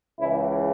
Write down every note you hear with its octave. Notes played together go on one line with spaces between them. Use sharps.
C#2 C#3 E3 E4